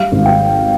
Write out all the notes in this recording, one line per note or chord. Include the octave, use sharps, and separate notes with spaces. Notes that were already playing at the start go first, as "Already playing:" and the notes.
Already playing: G3 F5
G#1
G5